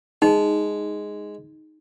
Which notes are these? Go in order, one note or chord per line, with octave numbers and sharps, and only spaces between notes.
G#3 D#4